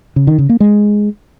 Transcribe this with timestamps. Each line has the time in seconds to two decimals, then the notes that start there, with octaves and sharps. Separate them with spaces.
0.16 C#3
0.27 D#3
0.38 C#3
0.49 A#3
0.60 G#3